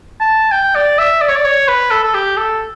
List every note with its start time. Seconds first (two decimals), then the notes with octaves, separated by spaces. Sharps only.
0.21 A5
0.52 G5
0.76 D5
0.98 E5
1.21 D5
1.29 C#5
1.36 D5
1.45 C#5
1.68 B4
1.91 A4
2.03 A4
2.14 G4
2.37 A4